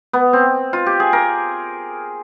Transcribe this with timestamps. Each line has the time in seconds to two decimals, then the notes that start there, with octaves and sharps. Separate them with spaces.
0.13 B3
0.33 C4
0.73 F4
0.86 G4
1.00 G#4
1.13 A#4